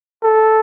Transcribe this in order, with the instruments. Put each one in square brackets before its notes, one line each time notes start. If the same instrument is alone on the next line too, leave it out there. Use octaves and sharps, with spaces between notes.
[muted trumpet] A4